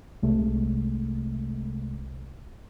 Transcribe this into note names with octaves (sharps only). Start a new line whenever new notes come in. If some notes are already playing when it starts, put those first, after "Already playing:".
C2 C3 G#3 A3